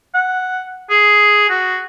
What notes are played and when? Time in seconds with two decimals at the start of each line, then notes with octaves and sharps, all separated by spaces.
0.15 F#5
0.90 G#4
1.50 F#4